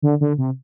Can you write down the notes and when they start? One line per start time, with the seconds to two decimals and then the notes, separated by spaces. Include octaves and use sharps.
0.02 D3
0.21 D3
0.38 C3